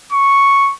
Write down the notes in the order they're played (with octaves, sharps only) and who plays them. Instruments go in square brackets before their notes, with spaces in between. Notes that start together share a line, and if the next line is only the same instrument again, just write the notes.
[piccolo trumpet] C#6